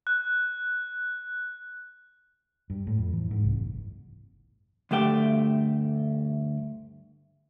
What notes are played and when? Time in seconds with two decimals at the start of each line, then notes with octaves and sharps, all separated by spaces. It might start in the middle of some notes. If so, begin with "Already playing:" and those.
0.07 F#6
2.70 G2
2.87 A2
2.98 F2
3.13 E3
3.31 G#2
3.44 C2
3.57 F#1
4.91 D2 G2 A3 G4 G5